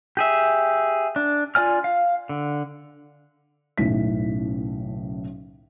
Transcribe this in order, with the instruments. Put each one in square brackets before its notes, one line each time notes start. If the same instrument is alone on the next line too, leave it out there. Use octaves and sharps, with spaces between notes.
[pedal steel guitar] G4 G#4 E5
D4
F4 D5 G#5 F6
F5
D3
[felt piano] F#1 B1 A2 A3 B6